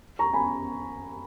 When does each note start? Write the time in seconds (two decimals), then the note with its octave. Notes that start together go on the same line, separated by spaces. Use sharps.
0.19 A#5 C#6
0.33 G#5 B5